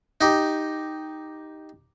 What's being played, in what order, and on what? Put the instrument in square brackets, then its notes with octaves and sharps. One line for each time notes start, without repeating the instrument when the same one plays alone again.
[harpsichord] D#4 G4